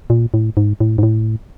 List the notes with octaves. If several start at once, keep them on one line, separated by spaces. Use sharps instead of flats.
A#2
A2
G#2
A2
G#2
A2